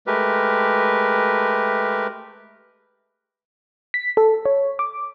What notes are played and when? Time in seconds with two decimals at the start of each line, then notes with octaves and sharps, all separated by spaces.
0.07 G#3 A3 G4 A#4 B4
3.94 B6
4.17 A4
4.45 C#5
4.79 D6